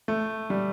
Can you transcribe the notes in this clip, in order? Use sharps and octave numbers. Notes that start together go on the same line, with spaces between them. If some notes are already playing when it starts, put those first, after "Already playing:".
A3
G3